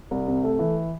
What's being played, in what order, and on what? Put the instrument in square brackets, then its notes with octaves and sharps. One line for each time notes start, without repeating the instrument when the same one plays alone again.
[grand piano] C2
C3
A3
E3